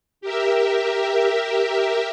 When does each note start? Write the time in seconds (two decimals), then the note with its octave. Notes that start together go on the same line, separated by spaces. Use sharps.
0.21 G4 A#4 E5